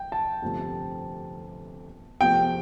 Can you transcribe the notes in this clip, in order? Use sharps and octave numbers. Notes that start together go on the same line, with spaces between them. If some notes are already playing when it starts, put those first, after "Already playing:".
Already playing: G5
A5
G1 F2 C3 F3 A3
E2 C3 F3 A3 G5